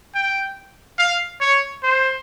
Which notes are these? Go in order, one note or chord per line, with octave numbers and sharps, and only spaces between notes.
G5
F5
C#5
C5